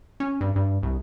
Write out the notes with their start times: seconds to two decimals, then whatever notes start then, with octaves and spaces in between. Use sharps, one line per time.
0.20 C#4
0.41 G2
0.56 G2
0.83 C2